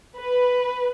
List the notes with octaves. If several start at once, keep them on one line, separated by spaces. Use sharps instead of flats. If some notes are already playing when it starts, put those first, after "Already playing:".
B4